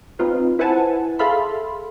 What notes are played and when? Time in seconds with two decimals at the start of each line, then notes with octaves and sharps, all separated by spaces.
0.19 C4 D#4 F4 B4
0.59 E4 B4 C5 F#5 G#5 A5
1.19 G#4 A4 E5 F5 B5 C6